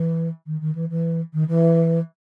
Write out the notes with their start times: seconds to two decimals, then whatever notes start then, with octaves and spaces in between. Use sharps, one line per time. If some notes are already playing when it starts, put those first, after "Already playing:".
Already playing: E3
0.46 D#3
0.61 D#3
0.75 E3
0.90 E3
1.33 D#3
1.48 E3